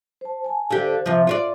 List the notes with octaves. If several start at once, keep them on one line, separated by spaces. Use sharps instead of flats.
C5 A5
G#5 A5
D3 G4 C5 F5
C3 F3
F4 C#5 D5